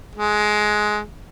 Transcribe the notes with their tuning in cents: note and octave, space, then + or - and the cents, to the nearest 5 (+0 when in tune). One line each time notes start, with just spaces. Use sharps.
G#3 +15